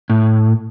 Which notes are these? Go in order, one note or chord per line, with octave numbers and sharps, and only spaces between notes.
A2